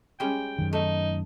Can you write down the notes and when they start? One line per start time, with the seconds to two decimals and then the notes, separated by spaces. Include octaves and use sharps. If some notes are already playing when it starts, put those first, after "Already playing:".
0.20 G3 G#3 C#4 G5
0.59 F#2 D#3
0.73 A3 D#4